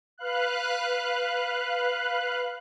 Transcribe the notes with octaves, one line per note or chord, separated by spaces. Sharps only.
B4 F5 F#6